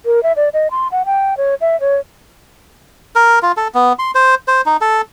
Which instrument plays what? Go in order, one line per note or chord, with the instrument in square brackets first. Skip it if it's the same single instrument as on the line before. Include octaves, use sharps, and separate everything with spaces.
[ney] A#4
E5
D5
D#5
C6
F#5
G5
C#5
E5
C#5
[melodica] A#4
F4
A4
B3
C6
C5
C5
D#4
A4